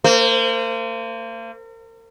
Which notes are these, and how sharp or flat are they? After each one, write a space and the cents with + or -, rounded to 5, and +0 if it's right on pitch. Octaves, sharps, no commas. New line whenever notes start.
A#3 -40 C5 -25